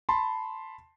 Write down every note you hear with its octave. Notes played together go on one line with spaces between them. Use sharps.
A5 B5 C6